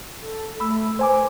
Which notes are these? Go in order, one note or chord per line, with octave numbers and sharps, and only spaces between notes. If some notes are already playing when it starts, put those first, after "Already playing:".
A4
A3 B5 E6
B4 C5 G#5 D6